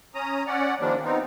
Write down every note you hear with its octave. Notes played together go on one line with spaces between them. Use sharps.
C#4 A#5 D#6
C#4 D5 F#5
D#3 F3 G3 A#3 D4
B3 C4 D#4